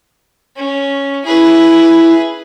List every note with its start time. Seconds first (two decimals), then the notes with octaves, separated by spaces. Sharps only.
0.56 C#4
1.25 E4 G#4 B4